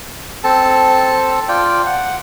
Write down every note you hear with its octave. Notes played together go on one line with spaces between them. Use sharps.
C4 A4 A5
F4 D5 G5
F#5